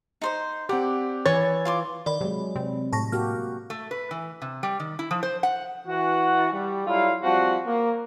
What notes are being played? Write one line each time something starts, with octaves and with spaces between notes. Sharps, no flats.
D#4 C5 C6
C4 G4 D5 F#5
E3 C#5 G#6 A6
F4 C6 D6
D#3 D5 B5
C3 F#3 G#3
C3 C4
A2 A5 C#6 A#6
A#3 F#4 G4 F6
A3
B4
E3
C3
G3
D#3
E4
F3
C5
F#5
E3 F#4 F#5
G3
F#3 G3 E4 F4 A4 F5
F3 G3 C4 F#4
A#3